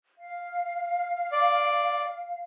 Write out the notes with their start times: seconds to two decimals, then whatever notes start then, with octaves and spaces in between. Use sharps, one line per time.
0.18 F5
1.32 D5